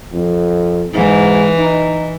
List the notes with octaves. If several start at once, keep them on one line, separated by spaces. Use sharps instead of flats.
F2
G#2 E3
D#4